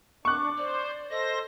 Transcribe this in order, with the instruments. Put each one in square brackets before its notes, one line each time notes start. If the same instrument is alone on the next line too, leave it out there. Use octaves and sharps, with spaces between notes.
[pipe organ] D4 [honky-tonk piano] C#6 F#6 [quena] D6
[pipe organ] C5 [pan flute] D5
[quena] A4 [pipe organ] C5 A#6 [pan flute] D#5